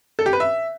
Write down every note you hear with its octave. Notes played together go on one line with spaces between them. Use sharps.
A4
G4
B4
E5